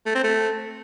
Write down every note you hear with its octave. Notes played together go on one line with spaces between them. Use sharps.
A3
C4
A3